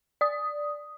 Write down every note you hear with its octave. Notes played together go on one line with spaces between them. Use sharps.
D5 D#6